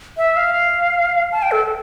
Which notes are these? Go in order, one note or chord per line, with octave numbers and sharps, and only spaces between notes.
E5
F5
A5
G5
A4